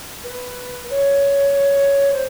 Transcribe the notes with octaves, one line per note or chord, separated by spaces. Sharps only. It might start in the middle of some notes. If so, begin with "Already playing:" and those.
B4
C#5
C5